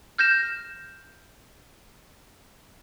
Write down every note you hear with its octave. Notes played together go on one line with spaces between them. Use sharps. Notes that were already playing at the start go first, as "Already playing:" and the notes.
F6 G6 A#6 E7